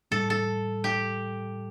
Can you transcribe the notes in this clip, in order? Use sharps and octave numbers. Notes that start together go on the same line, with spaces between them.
A2 E3 G3 A4
A4
G4